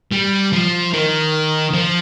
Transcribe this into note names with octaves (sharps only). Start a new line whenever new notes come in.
G3
F3
D#3
F3